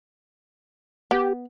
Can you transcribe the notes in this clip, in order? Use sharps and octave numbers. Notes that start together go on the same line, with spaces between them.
B3 G4